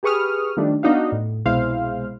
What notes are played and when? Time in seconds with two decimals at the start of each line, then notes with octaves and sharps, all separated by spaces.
0.03 G4 G#4 B4 C#6 D#6 F6
0.57 D#3 F3 G3 A3 D4
0.83 B3 D4 D#4 F#4 F5
1.12 A2
1.45 C2 B2 G#3 E4 C5 F5